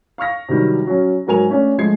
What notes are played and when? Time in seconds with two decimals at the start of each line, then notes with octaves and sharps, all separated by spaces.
0.18 F5 C#6 F6 A#6
0.49 C3 D#3 F#3 G3 D4
0.87 F#3 C#4
1.27 G#2 F#3 A#4 G#5 F7
1.50 A3 C#4 D4
1.78 F3 G#3 A3 G#6 C7